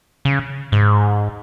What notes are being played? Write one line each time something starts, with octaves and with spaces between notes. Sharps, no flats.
C#3
G#2